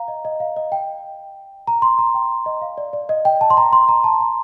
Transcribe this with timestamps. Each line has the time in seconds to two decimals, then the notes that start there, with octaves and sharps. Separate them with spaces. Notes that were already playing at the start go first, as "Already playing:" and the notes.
Already playing: F5 A#5
0.08 D#5
0.25 D#5
0.40 F5
0.56 D#5
0.72 G5
1.67 A#5
1.82 C6
1.99 A#5
2.14 G5
2.46 D#5
2.62 F5
2.78 D5
2.93 D5
3.09 D#5
3.25 G5
3.41 A5
3.50 C6
3.57 A#5
3.73 C6
3.89 A#5
4.04 A5
4.21 A#5